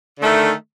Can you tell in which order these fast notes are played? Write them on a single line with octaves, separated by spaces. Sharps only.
D3 A3 D#3